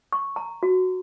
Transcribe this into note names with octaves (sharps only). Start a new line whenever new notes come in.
C#6
A#5
F#4